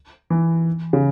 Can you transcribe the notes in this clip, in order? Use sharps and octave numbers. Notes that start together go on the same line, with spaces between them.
E3
C#3